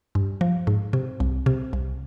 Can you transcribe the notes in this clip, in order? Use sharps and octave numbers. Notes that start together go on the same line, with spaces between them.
G2
F3
G#2
C3
C2
C3
C2